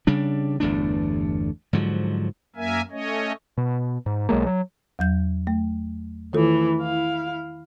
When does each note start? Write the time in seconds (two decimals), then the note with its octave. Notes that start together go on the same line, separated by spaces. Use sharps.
0.07 C#3 G3 D4
0.60 G1 E2 A3 D4
1.73 G#2 D3 F3 F#3
2.56 F#2 A#3 A#4 E5 G#5
2.91 A3 C#4 C#5 D#5
3.58 B2
4.06 G#2
4.29 B1 F#3 G#3 A#3
4.46 F#3
4.99 E2 F#3 G6
5.47 A3
6.33 D#3 E3 A3 F4 A4
6.79 E4 F5